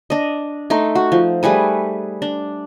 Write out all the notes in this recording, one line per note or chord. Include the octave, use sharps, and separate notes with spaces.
D4 D#5
A3 D#4 C6
F#4
F3
G3 A3 G#4 B4
D4